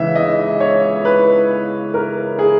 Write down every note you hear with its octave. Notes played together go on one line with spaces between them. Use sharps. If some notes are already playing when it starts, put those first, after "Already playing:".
Already playing: C#2 C#3 E3 E5
D#5
C#5
B4
A#4
G#4